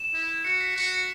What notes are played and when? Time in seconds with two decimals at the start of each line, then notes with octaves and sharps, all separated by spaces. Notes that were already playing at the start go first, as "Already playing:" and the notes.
Already playing: E7
0.14 E4
0.45 F#4 C#7
0.61 B6
0.76 F#4 C#7
0.92 C#7